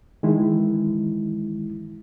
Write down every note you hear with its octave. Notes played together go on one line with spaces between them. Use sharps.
D#3 E3 G#3 E4